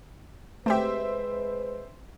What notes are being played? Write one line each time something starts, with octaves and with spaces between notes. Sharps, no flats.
G#3 A3 C4 G4 B4 C5 E5